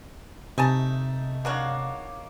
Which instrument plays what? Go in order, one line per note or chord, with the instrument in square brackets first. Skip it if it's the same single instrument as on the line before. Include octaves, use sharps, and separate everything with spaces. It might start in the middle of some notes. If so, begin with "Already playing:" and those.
[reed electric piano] C3 [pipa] A3 G#5 A5 [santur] D#4
[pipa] C#3 D4 F#4 [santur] A#3 C#5 F5